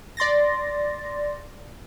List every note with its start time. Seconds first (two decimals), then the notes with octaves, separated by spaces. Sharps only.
0.17 D5 C6 A6 A#6